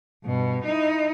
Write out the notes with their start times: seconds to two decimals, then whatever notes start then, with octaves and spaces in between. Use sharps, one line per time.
0.24 G2 B2
0.64 D#4 E4